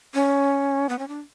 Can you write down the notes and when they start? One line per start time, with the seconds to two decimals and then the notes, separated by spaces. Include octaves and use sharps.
0.14 C#4
0.89 B3
0.99 C#4
1.08 D4